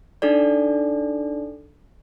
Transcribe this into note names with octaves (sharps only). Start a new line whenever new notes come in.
D4 D#4 A4 D5